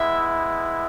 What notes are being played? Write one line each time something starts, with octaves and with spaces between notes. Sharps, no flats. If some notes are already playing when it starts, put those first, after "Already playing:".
Already playing: G#3 B3 E4 E5